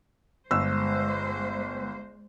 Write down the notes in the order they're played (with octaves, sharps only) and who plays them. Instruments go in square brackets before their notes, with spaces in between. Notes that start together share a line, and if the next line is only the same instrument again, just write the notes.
[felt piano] G1 E6 [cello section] G#3 C5